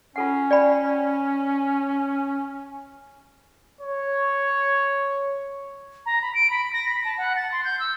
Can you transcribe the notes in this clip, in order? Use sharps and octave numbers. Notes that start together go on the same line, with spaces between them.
C#4 F4 A4 F#5
D5 G5 B5
C#5
A#5
B5
D7
B5
A#6
B5
A5
F#5
A6
C6
G6
E6